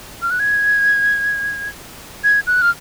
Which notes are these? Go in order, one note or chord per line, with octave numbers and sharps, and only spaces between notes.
F6
F#6
G#6
G#6
F#6
F6